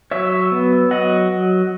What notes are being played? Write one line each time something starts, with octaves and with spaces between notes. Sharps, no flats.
F#3 C#5 E5
B3
F#3 D#5 F#5